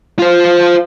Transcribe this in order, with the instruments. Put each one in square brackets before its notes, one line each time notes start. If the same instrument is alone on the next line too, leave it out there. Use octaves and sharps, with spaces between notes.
[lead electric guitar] F4 C5